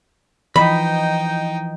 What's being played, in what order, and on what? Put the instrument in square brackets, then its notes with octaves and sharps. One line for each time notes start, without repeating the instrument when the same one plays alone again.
[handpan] E3 F3 D#5 [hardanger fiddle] D#4 G5 [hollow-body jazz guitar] B5